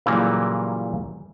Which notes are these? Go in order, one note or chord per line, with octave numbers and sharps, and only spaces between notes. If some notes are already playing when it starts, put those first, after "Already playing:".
A#2 C#3 E3 F#3 G3 A#3